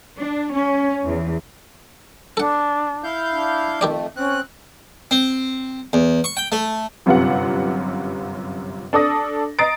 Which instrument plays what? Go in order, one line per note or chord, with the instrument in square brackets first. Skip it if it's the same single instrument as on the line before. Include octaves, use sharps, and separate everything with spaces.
[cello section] D4
C#4
E2
[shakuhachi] D4 [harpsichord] A4 F#5
[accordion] E4 F5 G6
[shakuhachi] D4
[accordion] F2 A3 [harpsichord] D#3 G4 D5
[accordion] C4 F#6 [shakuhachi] C#4
[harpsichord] C4
E2
C#6
G5
A3
[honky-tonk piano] G1 F#2 C3 F4 B4 F#5
D4 A4 D6 D#6 A#6
D#5 A#5 D#6 A6 C7 D7